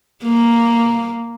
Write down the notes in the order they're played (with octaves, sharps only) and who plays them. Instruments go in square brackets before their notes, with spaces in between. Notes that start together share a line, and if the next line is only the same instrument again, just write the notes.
[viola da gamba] A#3